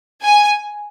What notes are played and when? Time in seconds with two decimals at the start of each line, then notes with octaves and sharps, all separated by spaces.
0.22 G#5